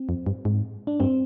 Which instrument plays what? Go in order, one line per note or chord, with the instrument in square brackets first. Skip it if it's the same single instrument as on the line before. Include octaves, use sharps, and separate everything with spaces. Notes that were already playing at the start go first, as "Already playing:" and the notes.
Already playing: [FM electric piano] C4
[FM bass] F2
G2
G#2
[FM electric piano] D4
[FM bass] G2 [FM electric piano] C4